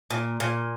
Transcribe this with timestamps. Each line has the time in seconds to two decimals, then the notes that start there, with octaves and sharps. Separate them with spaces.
0.11 A#2
0.40 A#2